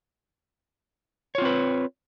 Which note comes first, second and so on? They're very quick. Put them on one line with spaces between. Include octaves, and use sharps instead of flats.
C#5 F4 C4 B4